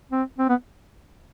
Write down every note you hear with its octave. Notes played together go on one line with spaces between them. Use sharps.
C4
C4
B3